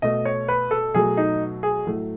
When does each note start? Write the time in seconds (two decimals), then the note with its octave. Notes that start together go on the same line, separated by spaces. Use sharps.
0.02 B2 A3 D#5
0.25 C#5
0.48 B4
0.71 A4
0.94 B2 F#3 A3 G#4
1.17 D#4
1.63 G#4
1.86 A2 F#3 A3